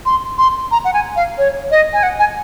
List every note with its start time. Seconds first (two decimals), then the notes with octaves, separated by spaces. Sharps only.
0.06 C6
0.38 C6
0.71 A#5
0.85 F#5
0.93 G#5
1.16 F5
1.38 C#5
1.71 D#5
1.93 G#5
2.03 F#5
2.19 G#5